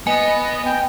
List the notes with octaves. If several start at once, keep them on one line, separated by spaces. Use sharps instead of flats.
B3 D#5 G#5
G5